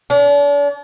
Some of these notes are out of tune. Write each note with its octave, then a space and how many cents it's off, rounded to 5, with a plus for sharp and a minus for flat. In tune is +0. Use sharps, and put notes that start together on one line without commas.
D4 -40